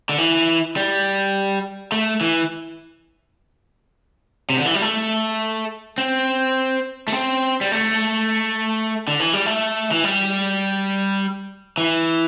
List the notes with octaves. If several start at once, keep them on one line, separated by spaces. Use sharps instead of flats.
D3
E3
G3
A3
E3
C3
D3
E3
G3
A3
C4
A3
C4
G3
A3
D3
E3
G3
A3
E3
G3
E3